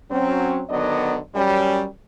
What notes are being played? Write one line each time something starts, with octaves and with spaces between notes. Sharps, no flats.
F#3 C4 C#4
D3 D#3 F#3 B3 D5 D#5
F#2 G3 C#4